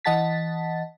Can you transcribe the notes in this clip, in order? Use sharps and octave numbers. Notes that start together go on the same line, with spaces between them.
E3 D#5 F#5 A5 A6 B6